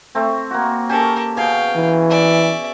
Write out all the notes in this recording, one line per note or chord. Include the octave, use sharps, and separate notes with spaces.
A3 C4
A#3 F#4
C#4 G4 A4 A#4
B2 G#4 F5 G5
E3
D5 E5